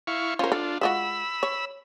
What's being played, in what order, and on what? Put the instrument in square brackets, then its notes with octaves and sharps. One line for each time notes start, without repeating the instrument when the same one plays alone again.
[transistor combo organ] E4 F5 C#6
[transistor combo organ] C#4 C5 [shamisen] F4 A#4
[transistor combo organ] D4 F4 [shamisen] A4
[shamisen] G#3 F4 F#4 [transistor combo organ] B5 E6
[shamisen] C#5